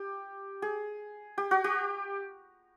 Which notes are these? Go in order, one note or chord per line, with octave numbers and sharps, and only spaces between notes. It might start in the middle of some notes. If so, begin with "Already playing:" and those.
Already playing: G4
G#4
G4
F#4
G4